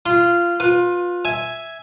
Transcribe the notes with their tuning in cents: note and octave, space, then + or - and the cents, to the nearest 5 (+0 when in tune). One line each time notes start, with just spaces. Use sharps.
F4 -15 C6 -25
F4 +20 B4 -5
E5 +0 G#5 +0